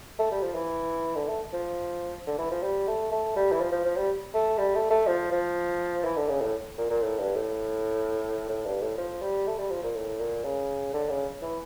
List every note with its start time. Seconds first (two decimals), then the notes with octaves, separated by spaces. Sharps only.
0.19 A3
0.31 G3
0.43 F3
0.55 E3
1.16 D3
1.28 A3
1.53 F3
2.27 D3
2.38 E3
2.51 F3
2.63 G3
2.88 A3
3.12 A3
3.36 G3
3.52 E3
3.61 F3
3.72 F3
3.85 F3
3.97 G3
4.34 A3
4.58 G3
4.75 A3
4.90 A3
5.07 F3
5.31 F3
6.05 E3
6.17 D3
6.29 C#3
6.42 A2
6.78 A#2
6.90 A#2
7.03 A2
7.19 G2
7.35 A2
8.49 A2
8.66 G2
8.82 A2
8.98 F3
9.22 G3
9.47 A3
9.58 G3
9.71 F3
9.83 A#2
9.96 A2
10.20 A#2
10.45 C#3
10.93 D3
11.10 C#3
11.42 E3